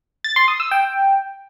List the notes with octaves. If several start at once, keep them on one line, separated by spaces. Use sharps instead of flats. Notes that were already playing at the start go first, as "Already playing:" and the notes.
A6
C6
D#6
E6
G5